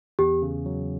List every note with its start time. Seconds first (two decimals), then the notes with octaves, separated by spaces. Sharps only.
0.19 E2 G4
0.42 C#3
0.66 F#3